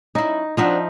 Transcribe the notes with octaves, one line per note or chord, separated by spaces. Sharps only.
C#4 D#4 E4
F3 C4 D4 D#4 F#4 E5